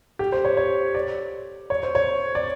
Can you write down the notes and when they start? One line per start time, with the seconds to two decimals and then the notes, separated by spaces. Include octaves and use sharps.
0.19 G4
0.32 C5
0.45 C#5
0.57 C#5
0.95 D5
1.70 C#5
1.83 C5
1.95 C#5
2.35 D5